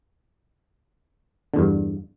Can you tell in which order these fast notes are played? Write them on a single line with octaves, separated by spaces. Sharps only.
D3 E2 G2